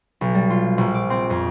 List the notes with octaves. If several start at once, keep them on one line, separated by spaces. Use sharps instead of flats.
B1
G3
F4
A#1
D6
C4
F2